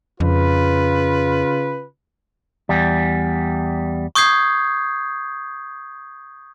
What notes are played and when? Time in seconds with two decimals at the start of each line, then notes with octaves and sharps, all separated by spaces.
0.20 F2 C#3 F4 B4
2.69 E2 G3
4.15 C#6 D#6 G6 G#6 C7